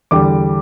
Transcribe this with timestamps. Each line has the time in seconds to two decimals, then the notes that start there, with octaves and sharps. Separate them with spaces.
0.11 E2 D3 G3 D6